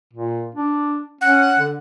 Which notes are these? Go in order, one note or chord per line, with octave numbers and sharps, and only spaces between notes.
A#2
D4
C#4 F#5
D3